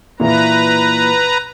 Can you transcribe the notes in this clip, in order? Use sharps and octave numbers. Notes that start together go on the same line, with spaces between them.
A#2 E3 B4 A#5